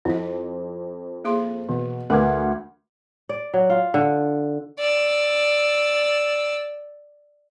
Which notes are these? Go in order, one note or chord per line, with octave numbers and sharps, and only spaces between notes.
F2 E4 D#5
A#3 G#4 C6
B2 E3
D2 A#4 B4 D6 G#6
D5
F#3
F4
D3
D5 E6